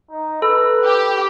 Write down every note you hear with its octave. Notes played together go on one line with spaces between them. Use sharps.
D#4
A4 B4
G4